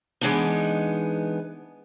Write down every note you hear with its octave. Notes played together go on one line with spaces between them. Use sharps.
E3 G#3 B3 D4 D#4